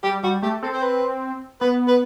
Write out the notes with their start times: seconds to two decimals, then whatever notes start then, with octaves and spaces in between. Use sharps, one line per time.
0.03 G3 G4
0.23 G3 F#4
0.42 A3 G4
0.63 C4 A4
0.74 C5
0.82 B4
1.61 B3 B4
1.88 B4